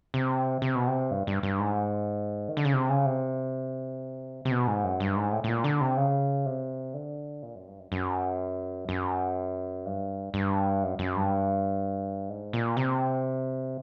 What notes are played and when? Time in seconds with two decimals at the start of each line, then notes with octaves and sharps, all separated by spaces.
0.14 C3
0.62 C3
0.75 B2
0.87 C3
1.11 G2
1.27 G2
1.43 G2
1.59 G#2
2.49 D#3
2.57 D3
2.65 C#3
2.74 C3
2.89 C#3
3.06 C3
4.45 C3
4.51 B2
4.67 G#2
4.84 F#2
5.00 G2
5.16 G#2
5.32 A2
5.44 A2
5.48 A#2
5.64 D3
5.81 C3
5.97 C#3
6.46 C3
6.94 D3
7.43 A#2
7.55 F#2
7.67 G2
7.79 F#2
7.92 F#2
8.89 F#2
9.86 G2
10.34 G2
10.83 F#2
10.99 F#2
11.16 G2
12.29 G#2
12.53 A#2
12.77 C3